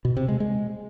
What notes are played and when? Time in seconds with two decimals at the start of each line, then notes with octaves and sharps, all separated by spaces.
0.05 B2
0.17 C3
0.28 G#3
0.40 G#3